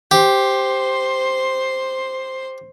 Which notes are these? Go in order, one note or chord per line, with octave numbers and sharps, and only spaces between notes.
G4 C5 C6